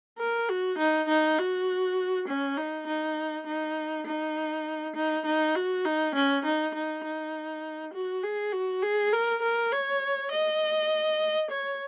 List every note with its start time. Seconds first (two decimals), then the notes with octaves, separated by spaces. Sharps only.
0.19 A#4
0.49 F#4
0.78 D#4
1.09 D#4
1.38 F#4
2.28 C#4
2.58 D#4
2.87 D#4
3.47 D#4
4.07 D#4
4.96 D#4
5.26 D#4
5.55 F#4
5.85 D#4
6.15 C#4
6.45 D#4
6.74 D#4
7.04 D#4
7.94 F#4
8.23 G#4
8.53 F#4
8.83 G#4
9.13 A#4
9.42 A#4
9.72 C#5
10.32 D#5
11.51 C#5